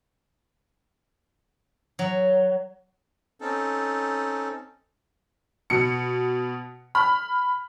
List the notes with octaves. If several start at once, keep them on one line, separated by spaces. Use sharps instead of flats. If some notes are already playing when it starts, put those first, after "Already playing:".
F#3
C4 C#4 D#4 A4
B2 C#7
B5 F6